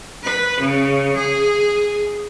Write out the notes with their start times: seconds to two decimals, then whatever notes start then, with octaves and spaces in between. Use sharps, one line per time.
0.24 B4
0.61 C#3
1.16 G#4